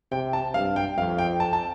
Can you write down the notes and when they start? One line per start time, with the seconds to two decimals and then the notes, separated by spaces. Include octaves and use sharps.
0.11 C3 G5
0.33 A5
0.54 G2 F5
0.76 G5
0.97 F2 F5
1.19 G5
1.40 A5
1.53 A5